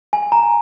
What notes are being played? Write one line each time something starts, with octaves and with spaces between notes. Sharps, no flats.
G#5
A#5